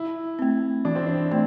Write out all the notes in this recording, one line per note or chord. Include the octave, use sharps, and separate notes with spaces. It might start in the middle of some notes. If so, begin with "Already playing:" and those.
Already playing: E4
A3 C4
E3 D4
C4
D4
A3 C4